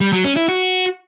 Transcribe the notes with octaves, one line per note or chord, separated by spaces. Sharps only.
G3
F#3
C#4
E4
F#4